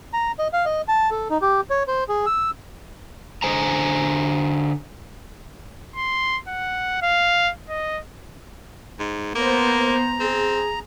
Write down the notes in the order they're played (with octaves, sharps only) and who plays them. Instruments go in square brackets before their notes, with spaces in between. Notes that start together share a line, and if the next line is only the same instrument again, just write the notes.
[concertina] A#5
D#5
F5
D#5
A5
A4
D#4
G4
C#5
C5
G#4
E6
[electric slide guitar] D3 C5 G#5 A#5
[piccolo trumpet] C6
F#5
F5
D#5
[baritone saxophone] G#2
[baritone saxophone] A#3 [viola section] B3 C5 [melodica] A#5
[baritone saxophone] C4 [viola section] G#4